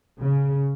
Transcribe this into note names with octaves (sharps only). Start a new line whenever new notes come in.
C#3